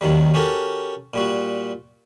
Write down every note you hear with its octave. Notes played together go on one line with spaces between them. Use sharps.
D#2 D#3 F#3 G3
C#4 F#4 G4 A4 A#4
A#2 G3 F#4